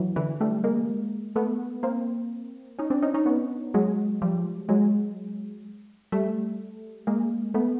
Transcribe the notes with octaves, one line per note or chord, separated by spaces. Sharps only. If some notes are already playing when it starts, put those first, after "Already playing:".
Already playing: E3 F#3
D3 E3
G3 A3
G#3 A#3
A3 B3
A#3 C4
C#4 D#4
C4 D4
C#4 D#4
C#4 D#4
B3 C#4
F#3 G#3
F3 G3
F#3 G#3
G3 A3
G#3 A#3
A3 B3